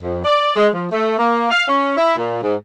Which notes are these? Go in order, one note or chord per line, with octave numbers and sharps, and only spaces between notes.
F2
D5
G#3
F3
A3
A#3
F5
C#4
E4
A#2
G#2